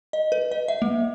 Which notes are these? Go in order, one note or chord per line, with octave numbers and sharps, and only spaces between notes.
D#5
B4
D#5
E5
A#3